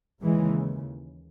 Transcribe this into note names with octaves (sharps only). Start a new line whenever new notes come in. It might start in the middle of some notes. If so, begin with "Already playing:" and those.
D#2 C#3 E3 G#3